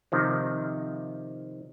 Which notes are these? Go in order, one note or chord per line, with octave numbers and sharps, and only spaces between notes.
C3 D#3 F3